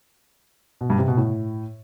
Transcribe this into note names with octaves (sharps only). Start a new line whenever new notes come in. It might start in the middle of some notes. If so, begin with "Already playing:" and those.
B2
G2
C3
B2
A2